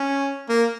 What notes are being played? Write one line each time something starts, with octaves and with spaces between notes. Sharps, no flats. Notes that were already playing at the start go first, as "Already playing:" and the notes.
Already playing: C#4
A#3